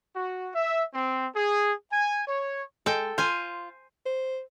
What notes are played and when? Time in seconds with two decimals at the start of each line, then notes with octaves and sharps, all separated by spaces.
0.16 F#4
0.55 E5
0.93 C4
1.36 G#4
1.92 G#5
2.27 C#5
2.86 G#3 A4 G5
3.18 F4 C5 G#5
4.06 C5